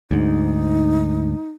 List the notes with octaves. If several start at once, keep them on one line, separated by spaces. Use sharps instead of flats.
D2 G#2 D#4